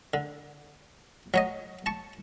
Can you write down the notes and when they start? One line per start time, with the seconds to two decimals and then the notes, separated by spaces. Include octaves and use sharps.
0.14 D3
1.34 F#3 C#5 D#5
1.86 A5 C#6